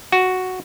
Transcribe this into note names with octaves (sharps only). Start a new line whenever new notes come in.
F#4